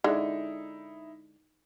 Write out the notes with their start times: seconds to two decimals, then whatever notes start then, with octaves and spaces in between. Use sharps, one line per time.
0.04 D3 G#3 D#4 E4